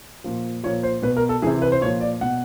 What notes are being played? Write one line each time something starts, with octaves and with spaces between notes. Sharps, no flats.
A#2 F3
A#2 F3 C#5
C5
B2 B4
A#4
A4
C3 E3 G#4
B4
C5
A#2 F3 C#5
D5
B2 F#5